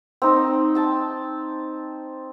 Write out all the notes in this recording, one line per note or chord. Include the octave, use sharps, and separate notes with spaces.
C4 D#4
G5 A5